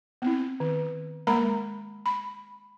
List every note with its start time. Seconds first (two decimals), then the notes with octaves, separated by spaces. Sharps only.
0.22 B3 C4 E4
0.60 D#3
1.27 G#3 A#3 A#4 A#5 B5
2.06 B5